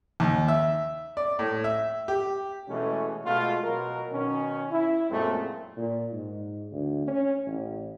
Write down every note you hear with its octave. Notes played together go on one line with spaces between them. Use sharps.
D#2
E5
D5
A2
E5
G4
B2 E3 G#3 A3 C#4
B2 G#3 A3 F4
B2 F#3 A#4
B2 D#3 C#4
E4
F#2 A#2 G#3 A3 C4
A#2
G#2
D2
C#4
A1